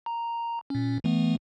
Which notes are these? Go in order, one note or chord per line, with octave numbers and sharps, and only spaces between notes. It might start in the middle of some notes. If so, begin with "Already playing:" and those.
A#5
A#2 C#4
E3 A3 B3